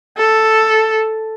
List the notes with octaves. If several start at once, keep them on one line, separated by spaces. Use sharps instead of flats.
A4